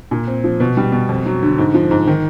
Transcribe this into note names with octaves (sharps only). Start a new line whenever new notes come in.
A#2
C4
F3
B2
G3
B2
F2
F#3
D3
G#2
F3
G#2
D#3